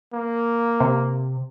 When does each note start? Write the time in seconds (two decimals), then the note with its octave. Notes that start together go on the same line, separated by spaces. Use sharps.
0.13 A#3
0.80 C3